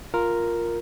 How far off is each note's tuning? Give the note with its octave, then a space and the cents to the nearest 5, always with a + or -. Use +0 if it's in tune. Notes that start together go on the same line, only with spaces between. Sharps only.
F4 +0 A#4 +0